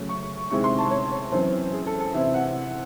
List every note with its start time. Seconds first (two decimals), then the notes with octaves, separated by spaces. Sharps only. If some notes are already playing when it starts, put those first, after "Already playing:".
Already playing: C#3 F#3 A3
0.09 C#6
0.50 C3 D#3 G#3 C4 E4 C#6
0.64 C6
0.78 A5
0.91 C#5
1.11 C#5
1.32 F#2 E3 C4 C5
1.73 G#4
1.86 A4
2.00 A4
2.13 C3 E3 C4 E4 E5
2.34 F#5